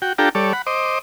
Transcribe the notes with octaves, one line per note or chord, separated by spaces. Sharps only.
F#4 G5
D4 F4 G4 A4 G5 A#5
G3 A4 C#5 D5
F#5 B5
C5 D#5 D6